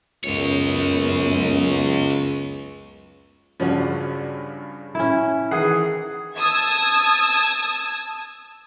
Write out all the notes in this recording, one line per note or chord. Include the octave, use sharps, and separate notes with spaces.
C#2 F#2 G#3 B3 C#5
G2 C#3 F3 C#4 F#4 D5
C#4 E4
D#3 E3 G#4 F#5 C7
A5 D#6 E6 G#6